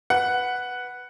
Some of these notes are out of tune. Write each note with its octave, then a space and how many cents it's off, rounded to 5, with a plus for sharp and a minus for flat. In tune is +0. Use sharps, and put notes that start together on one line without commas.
B4 +0 F#5 +0